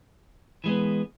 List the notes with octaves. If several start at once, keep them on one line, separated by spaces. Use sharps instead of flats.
E3 G#3 B3